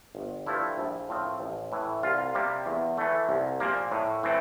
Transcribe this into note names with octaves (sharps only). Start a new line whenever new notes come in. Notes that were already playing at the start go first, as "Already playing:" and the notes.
G1
G2 F3 A3 E4
A#1
A2 F3 C4
A1
A2 E3
C2 F4
C3 G3 A#3
E2
E3 A3
C2
A#2 F3 A#3
A2
E3 A3 C4